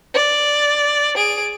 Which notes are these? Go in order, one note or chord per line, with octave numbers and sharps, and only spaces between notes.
D5
G#4 D7